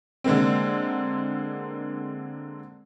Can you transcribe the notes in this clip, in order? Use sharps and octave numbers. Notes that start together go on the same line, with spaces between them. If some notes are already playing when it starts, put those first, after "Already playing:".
D3 G#3 A#3 C4